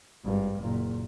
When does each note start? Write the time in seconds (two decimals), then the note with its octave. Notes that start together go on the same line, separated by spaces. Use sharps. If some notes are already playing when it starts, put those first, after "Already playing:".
0.24 G#1 G2
0.60 F#1 A#2